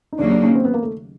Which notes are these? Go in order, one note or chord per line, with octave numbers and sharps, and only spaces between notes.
D#4
D#2 C#3 F#3 A#3 D4
D4
C#4
C4
B3
A#3
A3